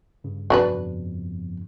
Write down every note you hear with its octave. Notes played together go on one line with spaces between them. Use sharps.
G2 C#3
F2 B2 F#3 D4 B4